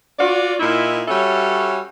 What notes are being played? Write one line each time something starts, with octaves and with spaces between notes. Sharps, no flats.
F4 F#4 D5
A#2 D#4 E4
G3 C#4 F#4 A4 C#5 E5